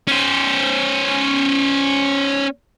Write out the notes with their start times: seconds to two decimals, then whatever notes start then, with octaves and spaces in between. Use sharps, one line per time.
0.08 C#4 C5